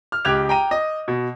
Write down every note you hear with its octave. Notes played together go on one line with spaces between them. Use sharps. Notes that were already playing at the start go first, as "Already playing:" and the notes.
F6
C#2 G4 D6 F#6 G#6 F7
G5 A#5 D#7
D#5
B2